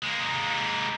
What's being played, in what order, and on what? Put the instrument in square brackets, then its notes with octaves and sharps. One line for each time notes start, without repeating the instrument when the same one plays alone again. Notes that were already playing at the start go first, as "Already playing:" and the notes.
[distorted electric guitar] G#3 A#3